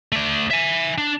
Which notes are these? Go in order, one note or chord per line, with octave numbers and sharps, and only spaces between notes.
A3 D5
E5 G#5
D4